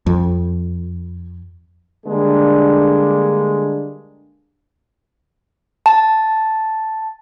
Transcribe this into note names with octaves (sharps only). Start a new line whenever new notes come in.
F2
D3 G3 G#3 A#3 D4
A5